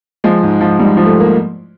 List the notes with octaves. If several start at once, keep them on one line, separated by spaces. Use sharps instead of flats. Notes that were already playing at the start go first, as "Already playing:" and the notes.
F3 G#3
G#2
F3
G#2 G3
F3
A3
A#3